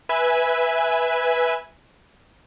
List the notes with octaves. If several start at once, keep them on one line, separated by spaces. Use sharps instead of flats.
B4 E5 G#5